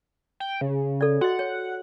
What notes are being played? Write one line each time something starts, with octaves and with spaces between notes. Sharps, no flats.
G5
C#3
A4 D5
F#4 D#5 F#5
C#5